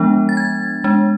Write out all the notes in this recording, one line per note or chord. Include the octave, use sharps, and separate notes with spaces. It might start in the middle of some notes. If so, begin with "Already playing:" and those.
Already playing: F3 G#3 B3 D4
A6
G#6
G#3 D4